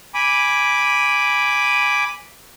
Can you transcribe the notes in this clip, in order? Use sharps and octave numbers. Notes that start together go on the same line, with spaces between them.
G#5 B5 D6